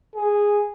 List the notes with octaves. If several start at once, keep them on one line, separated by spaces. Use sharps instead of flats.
G#4